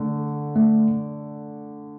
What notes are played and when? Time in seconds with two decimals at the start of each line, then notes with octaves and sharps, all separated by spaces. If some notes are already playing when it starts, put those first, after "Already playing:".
Already playing: D3 A3
0.56 A3